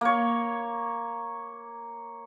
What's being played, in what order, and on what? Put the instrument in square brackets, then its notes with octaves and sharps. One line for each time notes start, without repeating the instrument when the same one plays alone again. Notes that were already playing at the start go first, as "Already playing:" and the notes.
[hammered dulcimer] A#3 C#5